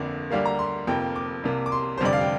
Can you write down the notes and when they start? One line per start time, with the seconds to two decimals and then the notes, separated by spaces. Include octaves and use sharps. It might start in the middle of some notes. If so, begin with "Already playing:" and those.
Already playing: G1 F2 D3 A#3 D5
0.31 D2 D3 G3 A#3 F5
0.45 A#5
0.59 C6
0.87 F1 F2 F3 A#3 G5
1.16 D6
1.44 C2 C3 A#3
1.66 D6
1.72 C6
1.98 C5
2.01 F1 F2 D3 G3 D5
2.13 F5
2.21 G5